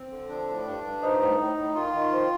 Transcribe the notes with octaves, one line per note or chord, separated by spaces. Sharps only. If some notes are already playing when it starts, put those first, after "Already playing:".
Already playing: C4
D3
F3 D4
A2
G2
G2
F3 D#4
A2
A2
A2
D#3 F4
D#3
F3